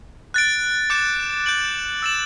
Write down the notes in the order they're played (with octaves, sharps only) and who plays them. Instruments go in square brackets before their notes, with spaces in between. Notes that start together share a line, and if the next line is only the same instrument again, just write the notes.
[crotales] F#6 A6 D7
D6 G6 C#7 E7
G6 D7 F#7
E6 A6 E7